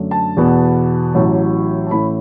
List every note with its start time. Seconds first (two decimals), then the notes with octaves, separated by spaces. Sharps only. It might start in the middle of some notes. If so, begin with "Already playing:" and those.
Already playing: F#2 D3 A3 D4
0.11 A5
0.37 E2 B2 B3
1.14 A1 A2 F#3
1.86 A5
1.91 A1 A2 A3 E4 B5